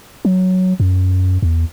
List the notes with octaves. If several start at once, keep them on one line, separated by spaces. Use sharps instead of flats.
F#3
F#2
E2